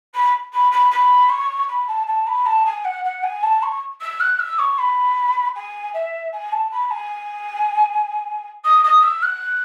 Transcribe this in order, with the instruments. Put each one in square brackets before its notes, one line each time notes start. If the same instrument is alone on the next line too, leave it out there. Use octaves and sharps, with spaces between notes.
[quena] B5
B5
B5
B5
C#6
B5
A5
A5
B5
A5
G#5
F#5
F#5
G#5
A5
C#6
E6
F#6
E6
C#6
B5
G#5
E5
G#5
A5
B5
G#5
D#6
D#6
E6
F#6